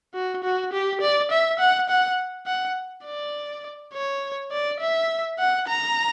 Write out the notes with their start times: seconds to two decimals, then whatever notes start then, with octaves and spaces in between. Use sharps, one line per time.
0.14 F#4
0.44 F#4
0.73 G4
1.01 D5
1.31 E5
1.59 F#5
1.89 F#5
2.47 F#5
3.05 D5
3.94 C#5
4.52 D5
4.80 E5
5.39 F#5
5.68 A#5